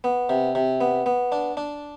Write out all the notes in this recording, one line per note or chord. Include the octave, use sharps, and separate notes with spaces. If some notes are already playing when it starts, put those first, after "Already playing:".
B3
C3
C3
B3
B3
D4
D4